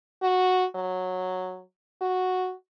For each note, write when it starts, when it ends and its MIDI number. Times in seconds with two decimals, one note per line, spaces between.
0.22 0.66 66
0.75 1.62 54
2.02 2.53 66